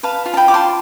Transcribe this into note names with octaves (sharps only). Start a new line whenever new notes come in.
B4 F5 A5
F4
A5
G5 B5
F4 D6
A5 C6